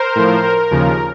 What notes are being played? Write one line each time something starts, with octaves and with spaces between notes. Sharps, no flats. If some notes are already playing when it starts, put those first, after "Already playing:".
Already playing: A#4 C5
A2 F3
A#4
D#2 C#3 F3